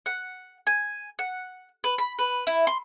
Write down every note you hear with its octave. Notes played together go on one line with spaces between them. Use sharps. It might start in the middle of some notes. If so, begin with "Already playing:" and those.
F#5
G#5
F#5
B4
B5
B4
E4
C6